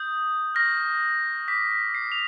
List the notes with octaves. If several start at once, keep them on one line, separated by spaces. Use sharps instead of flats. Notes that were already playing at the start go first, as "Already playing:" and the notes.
Already playing: D#6 G6
C#6 F6 A#6
D6 G6 B6
B6
C7
F7